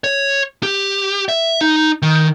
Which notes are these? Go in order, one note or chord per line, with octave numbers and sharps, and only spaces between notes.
C#5
G4
E5
D#4
D#3